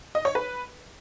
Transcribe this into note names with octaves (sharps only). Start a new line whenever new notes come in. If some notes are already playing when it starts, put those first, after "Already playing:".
D#5
C#5
B4